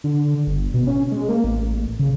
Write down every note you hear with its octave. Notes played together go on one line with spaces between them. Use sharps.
D3
G1
B2
C#4
G#3
A#3
A1
C#3